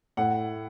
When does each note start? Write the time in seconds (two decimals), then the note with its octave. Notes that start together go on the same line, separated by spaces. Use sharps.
0.17 A2 F#5